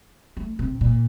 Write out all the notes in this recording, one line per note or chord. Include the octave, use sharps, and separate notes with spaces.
A3
C3
A#2